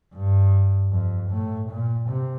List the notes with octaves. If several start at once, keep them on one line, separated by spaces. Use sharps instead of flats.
G2
F2
A2
A#2
C3